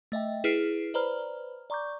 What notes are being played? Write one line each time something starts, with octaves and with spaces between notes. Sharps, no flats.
A3 D#5 E5 G5
E4 G#4 B4 F6 C7 D7
B4 C5 D5 A#5 B5 F6
D5 A#5 C#6 D6 G6